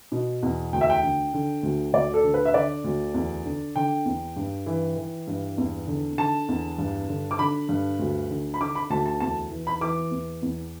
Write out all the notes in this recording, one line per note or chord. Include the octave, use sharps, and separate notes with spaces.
B2
E2
D2 G5
E5
G5
D3
D3
D2
D2 D5
A4
D3
B4
E5
D3 D5
D2
E2
D3
D3 G5
E2
G2
E3
E3
G2
E2
D3
D3 A5
E2
G2
D3
D6
D3 B5
G2
D2
D3
B5
D3 D6
B5
D2 A5
A5
E2 A5
E3
B5
E3 D6
E2
E2